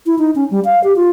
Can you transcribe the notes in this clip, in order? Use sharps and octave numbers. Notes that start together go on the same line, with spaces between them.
E4
D#4
C#4
G3
F5
G4
F4